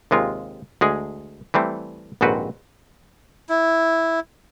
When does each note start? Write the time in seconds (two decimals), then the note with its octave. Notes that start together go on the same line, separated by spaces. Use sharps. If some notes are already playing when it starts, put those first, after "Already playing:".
0.11 D#2 C3 G#3 F4
0.81 D2 G#3 G#4
1.54 E3 G3 A3 C4
2.21 A#1 D#2 G#2 C4 F#4 B4
3.49 E4